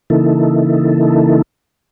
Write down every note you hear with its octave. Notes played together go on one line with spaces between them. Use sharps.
C#3 E3 A#3 D#4 E4 A4